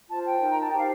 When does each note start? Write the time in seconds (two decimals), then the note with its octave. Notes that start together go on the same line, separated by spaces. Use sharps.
0.09 F4 C5 A5
0.25 G5
0.40 D#4 A#4
0.50 A#5
0.60 A5
0.68 D#4 G4 C5 G5
0.78 F5